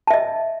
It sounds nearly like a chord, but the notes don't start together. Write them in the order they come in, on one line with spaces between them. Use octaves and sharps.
A5 E5 D#5